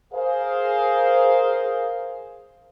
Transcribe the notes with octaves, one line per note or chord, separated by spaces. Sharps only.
G#4 A#4 C5 F5